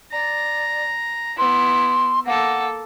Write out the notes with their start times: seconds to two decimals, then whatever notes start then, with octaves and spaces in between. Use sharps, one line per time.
0.12 D5 A#5
1.38 B3 E4 C6
2.25 A#3 A4 F#5